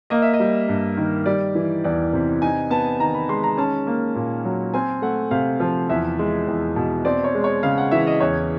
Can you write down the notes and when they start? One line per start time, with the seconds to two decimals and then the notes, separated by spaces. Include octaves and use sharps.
0.10 A#3 D#5
0.22 E5
0.33 D#5
0.40 G3
0.69 G2
0.97 D#3
1.26 G3 D5
1.55 E3
1.84 E2 D5
2.13 C3
2.42 D#4 G#5
2.70 B3 A5
3.00 D#3 A#5
3.14 B5
3.29 G#3 C6
3.43 A#5
3.57 C#4 A5
3.87 A#3
4.15 A#2
4.45 F#3
4.74 C4 G#5
5.02 A3 F#5
5.31 C3 F5
5.60 F3
5.90 E2 E5
6.19 G#3
6.48 E2
6.76 B2
7.05 C4 D5
7.24 C#5
7.35 G#3
7.44 C#5
7.63 C#3 F5
7.78 F#5
7.91 E3 E5
8.07 D#5
8.20 E2 C#5